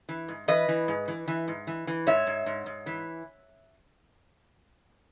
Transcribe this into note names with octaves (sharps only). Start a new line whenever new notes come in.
E3
G#2
E3 B4 D#5
E3
G#2
E3
E3
G#2
E3
E3
G#2 C#5 E5
G#2
G#2
G#2
E3